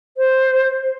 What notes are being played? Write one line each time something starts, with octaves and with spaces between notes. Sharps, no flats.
C5